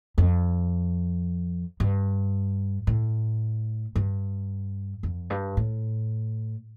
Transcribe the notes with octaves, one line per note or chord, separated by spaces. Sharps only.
F2
G2
A2
G2
F2
G2
A2